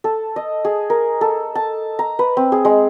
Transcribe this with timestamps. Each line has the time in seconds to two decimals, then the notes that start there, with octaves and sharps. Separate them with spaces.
0.04 A4
0.36 D#5
0.65 G#4
0.90 A#4
1.21 A4
1.55 A5
1.99 A#5
2.19 B4
2.37 C4
2.52 G#4
2.65 G#3